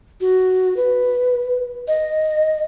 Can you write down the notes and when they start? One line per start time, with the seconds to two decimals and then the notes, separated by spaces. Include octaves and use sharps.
0.21 F#4
0.77 B4
1.88 D#5